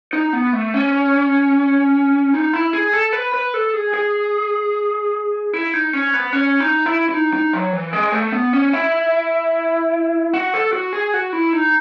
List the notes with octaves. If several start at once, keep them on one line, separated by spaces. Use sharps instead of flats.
D#4
B3
A3
C#4
D#4
E4
G#4
A4
B4
B4
A4
G#4
G#4
E4
D#4
C#4
B3
C#4
D#4
E4
E4
D#4
D#4
F#3
E3
G#3
A3
B3
C#4
E4
F#4
A4
F#4
G#4
F#4
E4
D#4